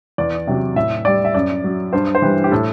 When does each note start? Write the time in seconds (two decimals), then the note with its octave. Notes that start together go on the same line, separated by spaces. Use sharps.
0.18 E2 D5
0.47 C3 F#3
0.76 A2 E5
1.05 G3 D5
1.25 E5
1.35 F#2 D5
1.64 F#3
1.93 G2 C5
2.15 C5
2.22 E3 G3 B4
2.44 G4
2.51 A2 A4